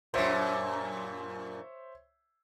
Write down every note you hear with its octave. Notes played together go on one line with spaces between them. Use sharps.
F#2 A#2 C5 C#5 E5